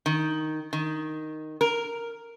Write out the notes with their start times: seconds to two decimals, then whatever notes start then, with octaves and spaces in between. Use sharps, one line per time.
0.06 D#3
0.73 D#3
1.61 A#4